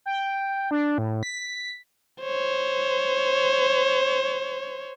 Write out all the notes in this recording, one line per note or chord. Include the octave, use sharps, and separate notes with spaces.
G5
D4
A2
B6
C5 C#5